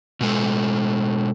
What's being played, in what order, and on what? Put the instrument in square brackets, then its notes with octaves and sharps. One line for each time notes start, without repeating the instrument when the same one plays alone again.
[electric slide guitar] B2 G#3 A4